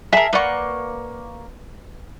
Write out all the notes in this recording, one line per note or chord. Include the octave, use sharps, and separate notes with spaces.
G#4 A#4 E5 A5
A#3 B4 D5 F#5 C#6